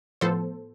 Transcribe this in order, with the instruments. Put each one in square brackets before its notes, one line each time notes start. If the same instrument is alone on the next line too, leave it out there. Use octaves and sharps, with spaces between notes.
[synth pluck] A2 F3 B3 A4 C5